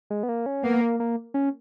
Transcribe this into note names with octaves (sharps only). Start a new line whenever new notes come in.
G#3
B3
A#3
C#4
A#3 B3
A#3
A#3
C#4